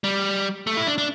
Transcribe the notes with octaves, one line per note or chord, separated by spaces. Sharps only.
G3
A3
E4
D4
D4